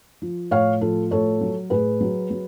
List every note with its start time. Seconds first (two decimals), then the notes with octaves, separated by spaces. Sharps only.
0.22 F3
0.51 A2 C#5 F5
0.81 F3 A4
1.11 A2 A4 C#5
1.41 F#3
1.70 A2 G#4 B4
2.01 F#3
2.30 F#3